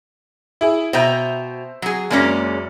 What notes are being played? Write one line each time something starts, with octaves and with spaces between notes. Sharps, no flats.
E4 G#4
B2 C5 E5 G5 A#5 G6
F#3 G#4
F#1 G#3 A#3 C#4 D5